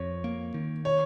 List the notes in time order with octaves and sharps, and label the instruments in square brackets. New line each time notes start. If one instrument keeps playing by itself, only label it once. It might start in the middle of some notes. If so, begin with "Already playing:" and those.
Already playing: [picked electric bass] F2 [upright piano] C#5
[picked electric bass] A#3
D#3
[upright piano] C#5